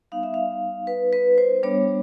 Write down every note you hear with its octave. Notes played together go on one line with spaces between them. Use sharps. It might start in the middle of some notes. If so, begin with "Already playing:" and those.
G3 B3 D#4 F5
E5
F5
B4
B4
C5
G3 B3 D4 C#5